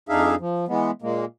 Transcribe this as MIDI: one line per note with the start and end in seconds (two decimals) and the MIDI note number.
0.09 0.35 41
0.09 0.35 62
0.09 0.35 63
0.09 0.35 68
0.09 0.35 76
0.09 0.35 77
0.40 0.65 53
0.68 0.91 52
0.68 0.91 56
0.68 0.91 59
1.02 1.25 46
1.02 1.25 56
1.02 1.25 58